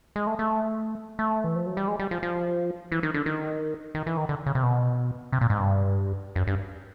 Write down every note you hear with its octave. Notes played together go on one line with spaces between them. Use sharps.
G#3
A3
A3
A3
E3
F3
F#3
G3
G#3
G3
F3
F3
E3
D#3
D3
D#3
D#3
E3
D#3
D3
C#3
C3
B2
C3
A#2
G#2
G2
F#2
G2